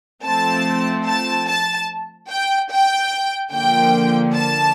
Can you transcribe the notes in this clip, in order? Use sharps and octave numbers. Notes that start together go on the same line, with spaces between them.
F3 A3 C4 A5
A5
A5
G5
G5
D3 F3 A#3 G5
A5